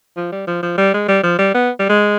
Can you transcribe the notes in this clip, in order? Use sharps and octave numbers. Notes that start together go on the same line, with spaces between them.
F3
G3
F3
F3
G3
G#3
G3
F3
G3
B3
G3
G#3